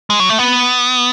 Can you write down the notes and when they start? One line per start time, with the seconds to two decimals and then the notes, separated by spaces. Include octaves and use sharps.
0.10 G#3
0.20 F#3
0.29 A3
0.39 B3